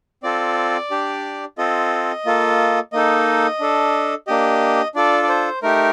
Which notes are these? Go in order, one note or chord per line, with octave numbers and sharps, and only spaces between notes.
C4 F4 A4 D5
D4 G4
C4 F4 A4 D#5
A#3 F4 A4
A#3 D#4 A4 D#5
D4 A4
A#3 D4 G4 D#5
D4 F4 A4 D5
D5
C5
A3 D#4 G4 A#4